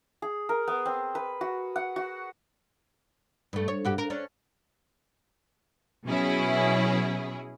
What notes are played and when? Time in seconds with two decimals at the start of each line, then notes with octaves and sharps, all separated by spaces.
0.22 G#4
0.49 A#4
0.68 B3
0.86 C4
1.15 B4
1.41 F#4
1.76 F#5
1.96 F#4
3.53 G2 A3
3.68 C#5
3.85 G2 F#4 G4
3.98 A#4
4.10 C#4 D4
6.06 B2 F#3 C#4 E4 G#4